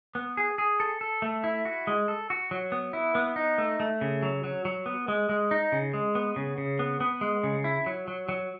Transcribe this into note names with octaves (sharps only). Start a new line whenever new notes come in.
B3
G#4
G#4
A4
A4
A3
E4
F#4
G#3
A4
F#4
F#3
B3
E4
B3
D#4
A3
A3
C#3
F#3
F#3
F#3
B3
G#3
G#3
D#4
C#3
G#3
B3
C#3
C#3
B3
B3
G#3
C#3
E4
F#3
F#3
F#3